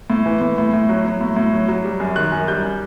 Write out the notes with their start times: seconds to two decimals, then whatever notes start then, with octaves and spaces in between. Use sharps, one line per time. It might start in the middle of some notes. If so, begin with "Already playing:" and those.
0.10 A2
0.26 E3
0.41 A2
0.58 A2
0.73 A2
0.89 F#3
1.05 F#3
1.21 A2
1.36 A2
1.53 F#3
1.68 F#3
1.84 G3
2.00 F#2
2.16 D#3 F#6
2.32 F#2
2.48 G3 G6